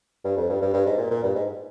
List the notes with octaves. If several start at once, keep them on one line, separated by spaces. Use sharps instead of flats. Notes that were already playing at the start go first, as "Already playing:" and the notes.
G2
F2
G2
G2
G2
G#2
A#2
A#2
G2
G#2